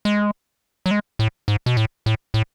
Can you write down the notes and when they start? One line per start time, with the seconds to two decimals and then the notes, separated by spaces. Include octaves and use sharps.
0.05 G#3
0.86 F#3
0.91 G#3
1.19 A2
1.48 G#2
1.66 B2
1.77 A2
2.06 A2
2.34 A2